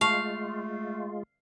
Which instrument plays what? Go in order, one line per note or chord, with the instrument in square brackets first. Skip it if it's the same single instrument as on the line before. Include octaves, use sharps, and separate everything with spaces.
[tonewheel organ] G#3 F4 [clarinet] A3 [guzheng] F5 [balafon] A5 C#6